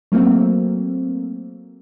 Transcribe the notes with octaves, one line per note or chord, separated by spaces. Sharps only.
F#3 A3 A#3 C4